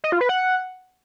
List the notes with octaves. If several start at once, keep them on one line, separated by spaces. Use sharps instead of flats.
D#5
F4
B4
F#5